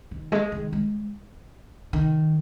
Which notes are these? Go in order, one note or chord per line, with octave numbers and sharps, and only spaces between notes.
D#3
G#3
D#3
G#3
D#3